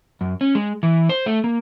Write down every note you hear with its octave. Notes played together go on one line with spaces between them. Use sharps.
F#2
C#4
G#3
E3
C5
A3
A#3